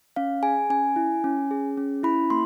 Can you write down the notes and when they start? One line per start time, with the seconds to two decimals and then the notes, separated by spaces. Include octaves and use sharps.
0.16 C#4 F5
0.43 G#4 G#5
0.70 C#4 G#5
0.96 E4
1.24 C#4
1.51 G#4
1.77 C#4
2.03 E4 B5
2.30 A#3 C6